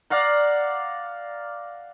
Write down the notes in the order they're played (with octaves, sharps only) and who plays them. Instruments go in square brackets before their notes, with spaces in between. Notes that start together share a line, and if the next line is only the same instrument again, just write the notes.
[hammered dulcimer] D5 F5 F#5 A#5